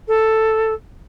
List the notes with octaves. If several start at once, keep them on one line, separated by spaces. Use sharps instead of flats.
A4